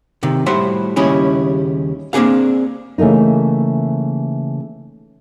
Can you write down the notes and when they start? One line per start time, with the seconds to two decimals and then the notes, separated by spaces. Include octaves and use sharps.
0.23 C3 D#3
0.46 A2 G3 F#4 C5 E5 C6
0.96 D#2 C#3 G3 C#4 E4 G#4
2.13 A#3 C4 D4 G#4 F5
2.98 C#3 E3 A3 A#3 D#4